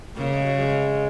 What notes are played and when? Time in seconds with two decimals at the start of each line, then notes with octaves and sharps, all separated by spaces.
0.17 C#3 A#3
0.31 G#3
0.44 F#3
0.58 G#3